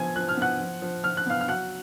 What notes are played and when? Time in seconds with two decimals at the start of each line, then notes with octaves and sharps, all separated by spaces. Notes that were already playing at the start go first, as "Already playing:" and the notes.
Already playing: F3 B3 G#5 G#6
0.16 F3 F#6
0.29 F6
0.37 B3 F#5 F#6
0.59 F3
0.82 F3
1.04 F3 F6
1.17 F#6
1.27 B3 F5 F6
1.41 F6
1.48 F#3 F#5 F#6